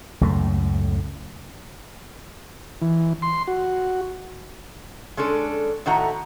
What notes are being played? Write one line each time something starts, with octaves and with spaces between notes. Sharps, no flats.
C#2 F#2 A2 A3
E3
C6
F#4
G#3 C#4 D4 A4
A2 D#3 A3 F#4 F#5 A#5